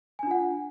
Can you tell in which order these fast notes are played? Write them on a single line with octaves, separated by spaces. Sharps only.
G#5 D4 F4 F#5